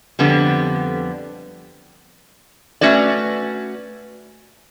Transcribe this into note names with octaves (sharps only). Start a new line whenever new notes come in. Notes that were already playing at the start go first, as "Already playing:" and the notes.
F2 D3 G3 B3
A3 C#4 F#4 B4 D5